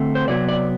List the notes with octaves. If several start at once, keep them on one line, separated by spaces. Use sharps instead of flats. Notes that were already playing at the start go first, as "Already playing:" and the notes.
Already playing: D3 A3 C4
C5
C3 F#3 B3 D5
D5